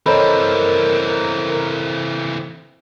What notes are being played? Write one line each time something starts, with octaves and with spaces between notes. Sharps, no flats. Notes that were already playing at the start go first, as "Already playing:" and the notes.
E3 C4 A4 A#4 C5 C#5 D#5 B5